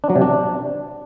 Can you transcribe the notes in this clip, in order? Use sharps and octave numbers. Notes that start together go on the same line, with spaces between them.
D4
F#3
C3
D4